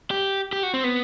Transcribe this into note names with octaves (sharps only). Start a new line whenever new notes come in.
G4
G4
F#4
C4
B3